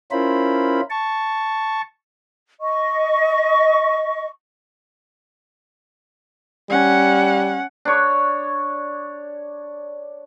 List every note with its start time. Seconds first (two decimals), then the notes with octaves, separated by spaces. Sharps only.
0.11 C#4 E4 F4 A#4 C5 B5
0.90 A5 C#6
2.60 D#5 C#6
6.70 G3 C#4 F#5
7.85 D4 C#5